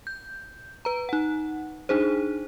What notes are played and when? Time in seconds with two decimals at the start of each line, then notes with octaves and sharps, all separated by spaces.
0.07 G6
0.85 B4 A#5
1.09 D#4 F#5
1.89 D4 D#4 G#4 C5